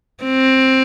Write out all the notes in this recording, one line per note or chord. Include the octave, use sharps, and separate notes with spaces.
C4